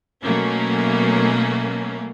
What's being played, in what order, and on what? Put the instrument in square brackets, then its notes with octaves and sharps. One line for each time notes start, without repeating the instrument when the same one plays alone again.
[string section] B2 F#3 A3 A#3 C#4